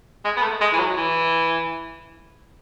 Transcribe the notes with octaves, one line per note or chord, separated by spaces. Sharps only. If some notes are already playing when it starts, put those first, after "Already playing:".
G#3
B3
A3
G#3
E3
F#3
E3